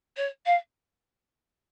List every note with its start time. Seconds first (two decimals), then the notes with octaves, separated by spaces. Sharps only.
0.17 C#5
0.46 F5